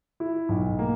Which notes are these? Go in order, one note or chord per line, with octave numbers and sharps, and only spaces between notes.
E4
B1
A#3